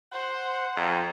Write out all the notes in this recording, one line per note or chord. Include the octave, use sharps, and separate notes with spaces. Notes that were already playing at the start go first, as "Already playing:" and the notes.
C5 F#5
F2 A#5